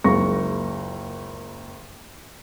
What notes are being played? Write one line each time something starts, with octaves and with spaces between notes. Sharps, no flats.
F#1 C#2 A#3 C#6 A#6